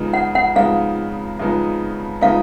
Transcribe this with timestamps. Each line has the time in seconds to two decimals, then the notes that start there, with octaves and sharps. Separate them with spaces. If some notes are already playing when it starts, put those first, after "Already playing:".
Already playing: C#3 F3 G#3 B3 D#4
0.14 F#5
0.35 F#5
0.55 C#3 F3 G#3 B3 D#4 F5
1.39 C#3 F3 G#3 B3 D#4
2.21 C#3 F3 G#3 B3 D#4 F5